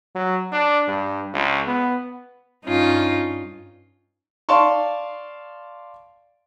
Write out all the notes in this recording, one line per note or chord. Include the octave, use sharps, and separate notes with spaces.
F#3
D4
G2
C#2
B3
G2 C#4 D#4 F4
D5 F5 A5 C6 C#6